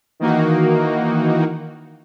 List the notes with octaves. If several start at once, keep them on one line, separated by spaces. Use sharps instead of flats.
D#3 E3 A#3 D#4 F#4